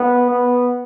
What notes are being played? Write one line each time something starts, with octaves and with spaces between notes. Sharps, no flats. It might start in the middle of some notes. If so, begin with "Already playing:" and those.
Already playing: B3
B3